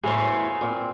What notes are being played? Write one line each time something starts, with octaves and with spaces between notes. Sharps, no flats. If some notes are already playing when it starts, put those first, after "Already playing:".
E2 A2 C#3 F#3 G#4 C5
A#2 C4